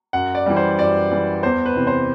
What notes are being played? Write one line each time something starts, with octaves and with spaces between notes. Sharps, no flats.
F#2 F#5
D5
E3 G3
C5
F#2 D5
E3 G3
E2 C5
B4
C3 E3
C5